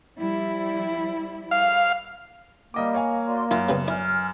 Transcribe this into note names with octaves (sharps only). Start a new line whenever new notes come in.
F3 G3 E4
F5
G3 A#3 D#5 D6
C#5 F5 G#5
F#4 D5 C6
F#2 E4 F4 C#5
C#3 G3 B3
E4 D5 G#5 F6